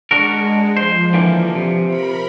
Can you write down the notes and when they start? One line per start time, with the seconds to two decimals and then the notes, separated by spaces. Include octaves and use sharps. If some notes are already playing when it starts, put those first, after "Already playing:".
0.11 G#3 D4 F#4 A#4
0.77 F3 C5
1.13 D3 E3 A#3
1.55 C3
1.87 A#4 B5